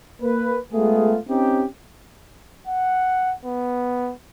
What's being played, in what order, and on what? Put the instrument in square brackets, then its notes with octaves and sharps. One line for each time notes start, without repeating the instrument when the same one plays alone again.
[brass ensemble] A#3 B4
G#3 A3 B3 F4 G#4
C4 C#4 D#4 G4
[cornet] F#5
B3